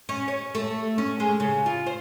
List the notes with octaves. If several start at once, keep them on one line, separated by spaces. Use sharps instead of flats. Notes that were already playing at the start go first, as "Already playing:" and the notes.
C#4
C#5
A3
C#4
G#3
C#3
F4
C5